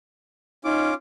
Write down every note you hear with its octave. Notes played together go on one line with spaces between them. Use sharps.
C#4 D#4 F4 D6